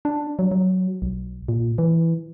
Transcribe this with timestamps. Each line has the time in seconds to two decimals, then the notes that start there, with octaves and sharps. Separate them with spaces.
0.05 D4
0.39 F#3
0.51 F#3
1.02 B1
1.48 A#2
1.78 E3